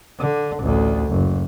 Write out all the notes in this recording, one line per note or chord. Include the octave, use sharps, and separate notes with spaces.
D3
A1 D2
F#1